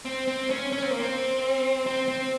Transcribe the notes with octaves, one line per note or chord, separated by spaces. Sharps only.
C4
C4
C#4
C#4
C4
A#3
C4
C4
C4